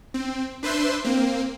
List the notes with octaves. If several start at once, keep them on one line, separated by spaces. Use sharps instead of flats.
C4
D4 B4 C5 E5 C6
A#3 C4